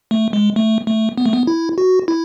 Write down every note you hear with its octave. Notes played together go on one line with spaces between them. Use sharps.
A3
G#3
A3
A3
B3
A3
B3
E4
F#4
E4